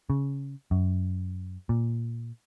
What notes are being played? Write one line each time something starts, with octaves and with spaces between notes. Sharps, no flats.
C#3
F#2
A#2